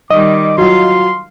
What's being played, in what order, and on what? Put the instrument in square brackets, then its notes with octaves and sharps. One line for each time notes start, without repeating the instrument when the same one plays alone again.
[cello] D#3 G3 [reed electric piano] D#5 [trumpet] D6
[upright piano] F#3 F4 [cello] F5 [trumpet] C6